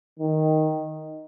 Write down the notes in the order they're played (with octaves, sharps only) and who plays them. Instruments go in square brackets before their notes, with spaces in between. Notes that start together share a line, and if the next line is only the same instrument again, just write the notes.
[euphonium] D#3